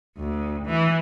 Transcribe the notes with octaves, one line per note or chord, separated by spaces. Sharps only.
D2
E3